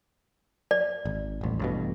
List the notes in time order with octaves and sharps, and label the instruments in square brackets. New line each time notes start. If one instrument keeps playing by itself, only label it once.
[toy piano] D5
[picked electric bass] G#1
D#1 A1
A1 G2 B2